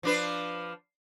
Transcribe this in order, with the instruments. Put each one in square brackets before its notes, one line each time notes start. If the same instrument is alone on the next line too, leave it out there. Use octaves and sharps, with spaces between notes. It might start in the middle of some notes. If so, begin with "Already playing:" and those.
[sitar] F3 D4 B4